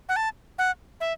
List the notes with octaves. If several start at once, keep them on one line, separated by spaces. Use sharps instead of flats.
F#5
A5
F#5
E5